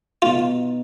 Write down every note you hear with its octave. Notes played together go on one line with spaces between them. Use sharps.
B2 B3 D#4 F4